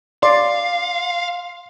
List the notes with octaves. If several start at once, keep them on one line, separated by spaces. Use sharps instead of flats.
D5 F5 C6